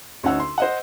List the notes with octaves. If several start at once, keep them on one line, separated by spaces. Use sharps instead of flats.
D2 D3 C#4 D#4 F#5 E6
C6
C5 D#5 F#5